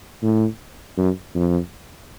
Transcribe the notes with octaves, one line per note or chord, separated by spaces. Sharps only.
A2
F#2
F2